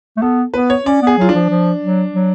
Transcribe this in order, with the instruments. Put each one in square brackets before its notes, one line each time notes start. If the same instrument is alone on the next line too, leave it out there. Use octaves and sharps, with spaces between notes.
[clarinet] A3
[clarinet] B3 [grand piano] A4
[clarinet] B3 [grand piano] B4
[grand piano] C#5
[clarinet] C#4 [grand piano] D5
[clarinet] B3 [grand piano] G#4
[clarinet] F#3 [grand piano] F4
[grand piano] D4
[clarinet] F3
F3
F#3
F#3